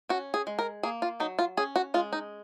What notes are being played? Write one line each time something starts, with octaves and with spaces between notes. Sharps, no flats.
C#4 F#4
G#4
G#3
A#4
A#3 G#4
F4
F#3 D#4
F4
C#4 G#4
F#4
G#3 F4
D#4